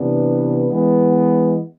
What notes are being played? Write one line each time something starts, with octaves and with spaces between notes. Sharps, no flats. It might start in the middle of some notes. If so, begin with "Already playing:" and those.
Already playing: C3 E3 B3 D4
E3 G#3 B3